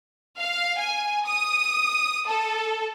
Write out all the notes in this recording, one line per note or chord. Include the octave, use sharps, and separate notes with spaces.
F5
G#5
D#6
A4